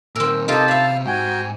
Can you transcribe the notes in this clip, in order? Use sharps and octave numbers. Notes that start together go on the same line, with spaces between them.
A#2 D#3 C4 A#4 E6
C3 D#4 F4 G4 A4 D#5 A5 A#5
E5 F5 B5
G#2 F#4 G5 G#5